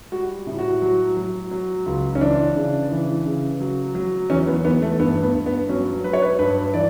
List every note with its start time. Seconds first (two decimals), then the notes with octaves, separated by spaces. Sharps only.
0.12 G3 F#4
0.47 A2
0.59 F#4
0.82 F#3
1.17 F#3
1.51 F#3
1.86 C#2
2.15 C#4
2.21 E3 D4
2.56 C#3
2.91 E3
3.26 C#3
3.60 F#3
3.95 F#3
4.30 E2 C#4
4.47 B3
4.65 E2 B3
4.82 A3
4.99 G2 B3
5.23 B3
5.35 G2
5.46 B3
5.69 F#3 C#4
6.04 F#3 B4
6.13 C#5
6.22 B4
6.39 G2 B4
6.74 E3 D5